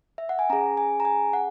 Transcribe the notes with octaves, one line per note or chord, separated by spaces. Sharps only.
E5
F#5
G#5
C#4 G#4 A#5
G#5
A#5
G#5
F#5